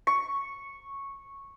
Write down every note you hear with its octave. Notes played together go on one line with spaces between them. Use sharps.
C#6